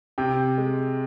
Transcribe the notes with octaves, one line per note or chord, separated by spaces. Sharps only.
C3 G5
G#3